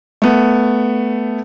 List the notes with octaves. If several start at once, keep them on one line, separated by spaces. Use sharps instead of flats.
A3 B3